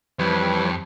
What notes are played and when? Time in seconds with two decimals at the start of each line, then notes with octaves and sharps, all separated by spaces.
0.19 F2 E3 G3 B4 C#5